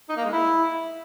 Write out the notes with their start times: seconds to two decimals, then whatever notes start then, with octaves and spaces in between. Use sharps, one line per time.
0.09 D#4
0.17 A#3
0.25 G#3
0.32 E4